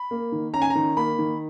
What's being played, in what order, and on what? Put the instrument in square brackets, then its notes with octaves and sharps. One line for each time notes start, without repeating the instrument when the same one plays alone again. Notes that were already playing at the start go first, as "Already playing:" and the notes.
Already playing: [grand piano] B5
A#3
D#3
C#4 A#5
G#5
A#5
D#3
A#3 B5
D#3